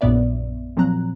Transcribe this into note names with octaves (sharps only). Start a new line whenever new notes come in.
A#1 F#2 A#2 B3 D5 E5
A#2 F3 F#3 C4 A#5 F#6